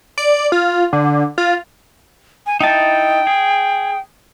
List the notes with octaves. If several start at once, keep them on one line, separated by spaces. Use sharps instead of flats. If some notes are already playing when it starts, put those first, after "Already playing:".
D5
F4
D3
F4
G#5
D#4 E4 G5 A5
G#4